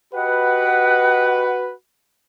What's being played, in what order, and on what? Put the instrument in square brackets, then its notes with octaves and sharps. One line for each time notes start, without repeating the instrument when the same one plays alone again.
[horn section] F#4 B4 [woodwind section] G4 D#5 F#5